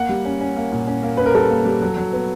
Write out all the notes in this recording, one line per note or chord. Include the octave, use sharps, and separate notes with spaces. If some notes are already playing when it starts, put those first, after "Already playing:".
Already playing: A#3 F#5
G3
C#4
C#4
A#3
A#2
C#4
A#3
C#4 B4
A#4
G3 A4
A#3
G3
F#3
F#3
B3